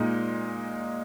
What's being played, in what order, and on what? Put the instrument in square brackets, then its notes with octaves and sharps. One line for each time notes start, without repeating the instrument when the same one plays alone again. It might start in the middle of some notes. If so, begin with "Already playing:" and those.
Already playing: [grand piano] A#2 G#3 D#4